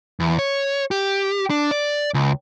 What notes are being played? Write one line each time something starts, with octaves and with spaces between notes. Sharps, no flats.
E2
C#5
G4
D4
D5
C#2